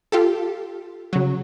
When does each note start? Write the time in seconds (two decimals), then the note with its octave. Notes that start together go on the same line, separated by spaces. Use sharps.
0.12 F4 G4 A4
1.13 C#3 F#3